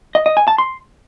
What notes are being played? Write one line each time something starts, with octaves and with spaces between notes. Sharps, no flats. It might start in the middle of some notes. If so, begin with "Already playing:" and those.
D#5
D#5
G#5
A5
C6